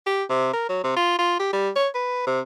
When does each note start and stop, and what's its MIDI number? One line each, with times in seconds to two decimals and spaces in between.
0.06 0.24 67
0.29 0.51 48
0.53 0.67 70
0.69 0.81 54
0.84 0.92 48
0.96 1.15 65
1.19 1.37 65
1.40 1.52 67
1.53 1.70 55
1.76 1.88 73
1.95 2.26 71
2.27 2.40 48